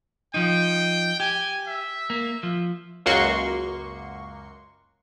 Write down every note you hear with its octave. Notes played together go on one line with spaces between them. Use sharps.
F3 D#4 G5
G4 G#5
E5
A#3
F3
C#2 F#2 A#3 F#4 C6 C#6